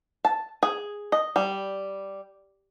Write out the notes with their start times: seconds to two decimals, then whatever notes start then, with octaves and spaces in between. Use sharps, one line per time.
0.25 A5
0.63 G#4
1.12 D#5
1.36 G3